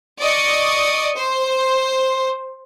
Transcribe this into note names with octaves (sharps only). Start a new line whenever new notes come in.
D5 D#5 C#6 D#6
C5